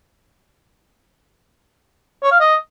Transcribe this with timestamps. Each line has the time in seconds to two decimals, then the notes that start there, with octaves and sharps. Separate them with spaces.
2.23 C#5
2.31 F5
2.40 D#5